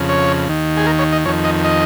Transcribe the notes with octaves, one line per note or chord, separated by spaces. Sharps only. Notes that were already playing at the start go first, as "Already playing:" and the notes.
Already playing: F2 C#3
C#5
D#2 D#3
G#4
A#4
C#5
D#5
F2 D#3 C#5
D#5
D#5